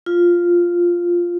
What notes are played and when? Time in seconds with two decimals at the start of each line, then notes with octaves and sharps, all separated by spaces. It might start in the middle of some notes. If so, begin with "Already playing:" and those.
0.06 F4